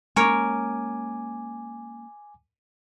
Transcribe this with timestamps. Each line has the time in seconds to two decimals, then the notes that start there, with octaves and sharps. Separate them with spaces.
0.16 G#3 A#3 C#4 A#4 C#5 G#5 D6